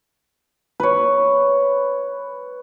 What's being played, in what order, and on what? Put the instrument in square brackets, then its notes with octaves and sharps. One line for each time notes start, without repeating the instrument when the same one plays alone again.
[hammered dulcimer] B4 C#5